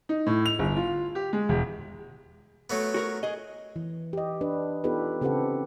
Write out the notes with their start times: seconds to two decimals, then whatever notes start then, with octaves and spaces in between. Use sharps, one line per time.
0.09 D#4
0.26 A2
0.46 F7
0.59 G1
0.77 F4
1.15 G4
1.33 G#3
1.49 E1
2.70 F#3 A3 B3
2.94 F#4 A#4 C#5
3.23 G#4 D#5
3.76 E3
4.13 G4 D#5
4.41 D4 G4 B4
4.84 B3 D#4 F4 G4 A4 B4
5.21 C#3 C4 G4 A4 B4 F#5